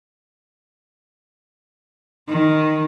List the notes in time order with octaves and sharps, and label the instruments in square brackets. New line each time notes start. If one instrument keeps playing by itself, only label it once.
[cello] D#3